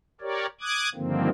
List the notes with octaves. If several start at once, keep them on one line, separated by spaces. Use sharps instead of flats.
G4 A#4 C#5 D5
D6 D#6 F#6 G#6
G2 D3 D#3 F3 A#3 C4